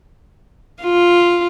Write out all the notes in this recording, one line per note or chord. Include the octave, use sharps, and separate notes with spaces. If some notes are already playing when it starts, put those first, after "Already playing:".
F4